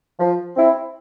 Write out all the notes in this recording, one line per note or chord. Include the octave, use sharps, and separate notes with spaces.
F3
C4 E4